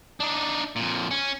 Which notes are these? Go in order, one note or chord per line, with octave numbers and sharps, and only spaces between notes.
D4 D#4
F2 A#2
C#4